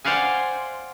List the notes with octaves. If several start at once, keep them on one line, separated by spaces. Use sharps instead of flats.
C5 D5 F5 F#5 G#5